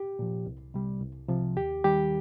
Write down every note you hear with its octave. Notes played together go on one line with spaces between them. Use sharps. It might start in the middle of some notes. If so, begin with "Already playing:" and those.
Already playing: G4
A#2 F3
C2
C3 G3
C2
C3 F3
D#2 G4
D#3 G3 G4